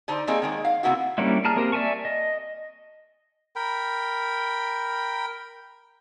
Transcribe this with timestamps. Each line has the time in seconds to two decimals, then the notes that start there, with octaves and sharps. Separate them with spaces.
0.08 D3 D4 D#4 C5
0.27 G3 A#3 C4 D#4 G#4 C#5
0.42 D#3 G#3 A#3
0.65 F5
0.83 C3 D#3 A#3 B3 E4 F#4
1.18 G3 A#3 C#4 D4 E4
1.44 G#4 A5 A#5 F6
1.56 A#3 C4 G4 A#4
1.72 D5 E5 G#5 A5 C#6
2.05 D#5
3.56 A#4 G5 B5